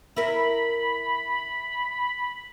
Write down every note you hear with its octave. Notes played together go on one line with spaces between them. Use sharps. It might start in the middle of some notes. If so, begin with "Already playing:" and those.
E4 A#4 B5